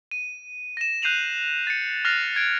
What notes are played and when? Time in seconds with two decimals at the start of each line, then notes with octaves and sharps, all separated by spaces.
0.11 D#7
0.77 A#6 E7
1.02 F#6 G6 C7 D#7 F7 F#7
1.67 A6 C#7
2.05 F6 F#6 A6 A#6 C7 F7
2.36 G#6 D7